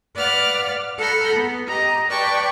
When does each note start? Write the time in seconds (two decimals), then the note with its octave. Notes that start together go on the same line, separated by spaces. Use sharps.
0.16 B4 D5 F5 F#5 F6
0.98 A4 F#5 A#5 B5 F6 G6
1.34 B3
1.67 G4 D#5 A#5
2.08 B4 D5 G5 A5 C#6